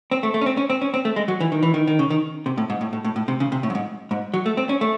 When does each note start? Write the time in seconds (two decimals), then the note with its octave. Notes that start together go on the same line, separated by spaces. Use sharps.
0.11 C4
0.23 A3
0.34 A3
0.41 C#4
0.46 C4
0.57 C#4
0.70 C4
0.81 C#4
0.94 C4
1.05 A3
1.16 G#3
1.28 F#3
1.40 E3
1.52 D#3
1.63 E3
1.74 D#3
1.87 D#3
1.99 C#3
2.10 D#3
2.46 C3
2.58 A2
2.70 G#2
2.81 A2
2.93 A2
3.04 A2
3.16 A2
3.28 C3
3.40 C#3
3.52 C3
3.63 A2
3.70 F#2
3.75 G#2
4.11 G#2
4.34 F#3
4.46 A3
4.57 C4
4.69 C#4
4.81 A3